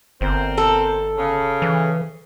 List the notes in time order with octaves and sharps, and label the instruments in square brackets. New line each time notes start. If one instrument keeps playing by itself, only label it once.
[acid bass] G1 [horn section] C4 A#4 C5
[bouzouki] A4
[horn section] C#3
[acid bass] E3